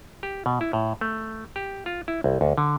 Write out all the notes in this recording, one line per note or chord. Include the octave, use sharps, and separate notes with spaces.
G4
B2
E4
A2
A3
G4
F4
E4
C2
D2
D3